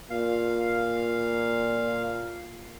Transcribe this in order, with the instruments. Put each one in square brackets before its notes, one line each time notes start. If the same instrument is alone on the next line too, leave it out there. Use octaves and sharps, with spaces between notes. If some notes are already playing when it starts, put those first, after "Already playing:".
[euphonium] A#2 [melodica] F5